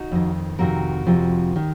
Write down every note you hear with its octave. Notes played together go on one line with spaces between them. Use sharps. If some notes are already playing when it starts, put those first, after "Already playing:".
Already playing: D#4 F#4
F2 D#3
F2 C3 D#3 F#4 A#4
F2 C3 F3
D#3